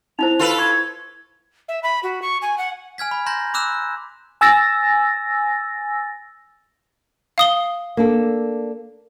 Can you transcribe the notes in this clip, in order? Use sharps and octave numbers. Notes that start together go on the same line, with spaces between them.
D#4 E4 C5 F7
F4 A4 B4
C#6 G#6
E5
B5
F#4
C#6
G#5
F#5
G#5 F6 G#6 B6
B5
A#5 C6 G6 A#6
B5 D6 E6 F#6 E7
G#5 E6 A6 A#6
F5 D#6 G7
A#3 D4 A4